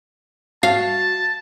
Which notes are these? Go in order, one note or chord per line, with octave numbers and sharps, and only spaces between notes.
F#4 F5 A5